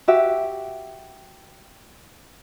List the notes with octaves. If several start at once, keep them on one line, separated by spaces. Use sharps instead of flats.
F#4 G4 E5